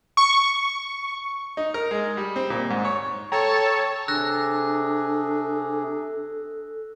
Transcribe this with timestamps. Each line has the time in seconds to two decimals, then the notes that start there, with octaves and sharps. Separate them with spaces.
0.17 C#6
1.57 D#4
1.74 A#4
1.91 G#3
2.17 G3
2.36 C4
2.50 A#2
2.70 G#2
2.85 C#5
3.32 A4 C#5 G5 A#5
4.08 C3 D4 G#4 A4 E6 F#6 A#6